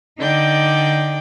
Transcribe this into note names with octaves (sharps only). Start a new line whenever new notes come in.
D3 D#4 D5 G5 G6